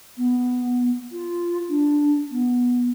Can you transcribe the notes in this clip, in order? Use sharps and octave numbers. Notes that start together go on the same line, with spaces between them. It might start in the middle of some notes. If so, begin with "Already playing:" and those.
B3
F4
D4
B3